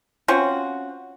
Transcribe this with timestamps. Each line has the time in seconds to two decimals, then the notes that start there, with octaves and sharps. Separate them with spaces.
0.28 C4 C#4 F4 F#4